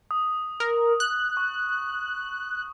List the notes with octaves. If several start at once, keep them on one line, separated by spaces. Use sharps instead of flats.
D#6
A#4
F#6
C#6